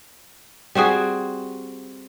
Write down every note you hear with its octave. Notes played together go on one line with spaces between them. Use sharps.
G3 C4 F#4 G#4